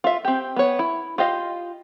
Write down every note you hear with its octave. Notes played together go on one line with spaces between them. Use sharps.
F4 E5
C4 G4
B3 C#5
E4
F4 G4 D#5 F5